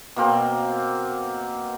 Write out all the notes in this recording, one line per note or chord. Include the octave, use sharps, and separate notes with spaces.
B2 A#3 C4